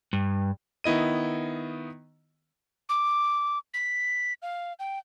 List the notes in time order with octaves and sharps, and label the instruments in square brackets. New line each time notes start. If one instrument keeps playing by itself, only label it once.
[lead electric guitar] G2
[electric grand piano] D#3 B3 E4 D#5 D#7
[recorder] D6
B6
F5
G5